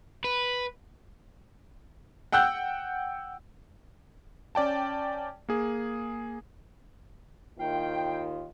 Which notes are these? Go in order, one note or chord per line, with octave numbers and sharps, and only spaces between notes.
B4
F#5 G5 E6 F#6 G6
C#4 D5 G5 A5
A#3 G#4
D#2 D#3 E4 F4 F5 G5